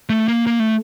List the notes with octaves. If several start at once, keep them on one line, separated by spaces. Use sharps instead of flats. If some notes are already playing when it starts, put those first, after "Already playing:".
A3
A#3
A#3
A3